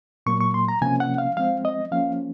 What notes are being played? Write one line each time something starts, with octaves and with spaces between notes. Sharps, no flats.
A#2 F#3 A#3 C#6
C#6
C6
A#5
C3 F3 A#3 C#4 G#5
F#5
F5
F3 G#3 C4 F5
D#5
F3 A#3 C#4 F5